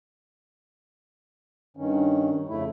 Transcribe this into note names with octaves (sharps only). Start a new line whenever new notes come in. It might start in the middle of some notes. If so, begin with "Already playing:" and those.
G2 D#3 C#4
F2 C#3 A3 E4